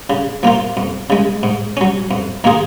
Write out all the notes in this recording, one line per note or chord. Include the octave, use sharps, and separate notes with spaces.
C#3
F3 A#3 F4
F2
C#3 G#3
G#2
F#3 C#4
F2
D#3 A#3 F4 G#4